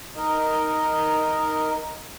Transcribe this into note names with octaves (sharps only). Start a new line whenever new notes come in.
D#4 A#4 D#5